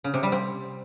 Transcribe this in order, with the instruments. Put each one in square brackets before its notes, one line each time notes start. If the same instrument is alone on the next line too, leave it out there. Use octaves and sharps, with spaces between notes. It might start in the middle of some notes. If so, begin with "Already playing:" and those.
[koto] C#3
C3
G3
C4